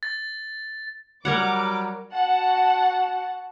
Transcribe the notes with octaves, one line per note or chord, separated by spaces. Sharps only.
A6
F#3 G3 A#4 C#5 F#5 D6
F#4 F#5 A5